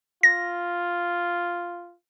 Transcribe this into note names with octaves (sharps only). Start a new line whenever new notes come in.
F4 A#6